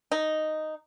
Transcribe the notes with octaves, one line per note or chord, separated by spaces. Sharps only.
D#4